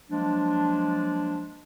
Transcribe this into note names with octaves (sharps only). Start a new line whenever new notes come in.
F3 F#3 G#3 A#3 D4